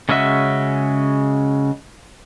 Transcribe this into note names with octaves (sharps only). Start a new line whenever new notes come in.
C#3 G#3 C#4 F#4 E5